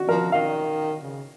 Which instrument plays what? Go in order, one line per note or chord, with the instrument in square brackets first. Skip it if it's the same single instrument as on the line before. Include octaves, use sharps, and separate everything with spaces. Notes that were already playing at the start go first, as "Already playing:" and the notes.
Already playing: [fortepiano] F#4
[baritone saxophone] F3 [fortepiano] A#4
[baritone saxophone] D#3 [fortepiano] F5
[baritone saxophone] C#3